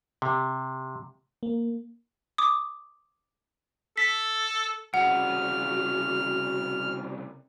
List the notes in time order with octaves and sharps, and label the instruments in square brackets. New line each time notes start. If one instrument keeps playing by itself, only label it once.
[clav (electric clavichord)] C3
[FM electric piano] A#3
[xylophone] D6 D#6
[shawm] A4 [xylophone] B6
[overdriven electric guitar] C2 C#3 [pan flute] F#4 [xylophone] F#5 [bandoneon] F6